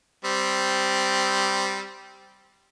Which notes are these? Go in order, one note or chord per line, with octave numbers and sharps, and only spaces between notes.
G3 C4